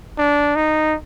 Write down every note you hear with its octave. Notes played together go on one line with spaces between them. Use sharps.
D4
D#4